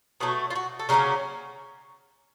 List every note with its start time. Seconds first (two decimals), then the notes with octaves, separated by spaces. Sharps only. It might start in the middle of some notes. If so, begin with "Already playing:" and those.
0.20 B2 F#3 A3 F#4
0.50 F4
0.55 F#4
0.79 A4
0.89 C#3 F#3 A#3 C#4 A#4